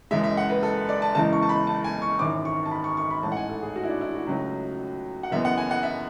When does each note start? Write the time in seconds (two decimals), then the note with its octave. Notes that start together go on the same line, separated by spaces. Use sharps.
0.11 F#1 F#2 E3 G#3 E5
0.24 E5
0.37 F#5
0.50 B4
0.63 A4
0.89 D5
1.02 A5
1.15 F#1 E2 C#3 E3 G#3 A5
1.33 C#6
1.42 A5
1.49 B5
1.67 A5
1.84 G#5
2.02 C#6
2.19 G#1 F#2 E3 D6
2.45 C#6
2.65 A5
2.71 B5
2.84 C#6
2.97 C#6
3.11 B5
3.23 A1 G#2 E3 A3 A5
3.32 F#5
3.37 G#5
3.49 A4
3.62 G#4
3.76 F#4
3.83 E4
3.88 D4
4.01 E4
4.15 F#4
4.27 C#2 C#3 F#3 A3
5.23 F#5
5.31 F#1 F#2 E3 B3 E5
5.45 F#5
5.58 G#5
5.71 F#5
5.83 E5